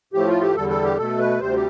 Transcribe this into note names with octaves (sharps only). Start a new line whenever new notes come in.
A2 F3 A3 G4
F4
G4
E2 D3 G3 A4
A4
G4
B2 A3 A4
B4
D2 C3 G3 C5
G4